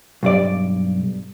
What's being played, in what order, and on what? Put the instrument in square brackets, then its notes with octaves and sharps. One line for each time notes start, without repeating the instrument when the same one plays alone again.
[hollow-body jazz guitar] B1 G2 D5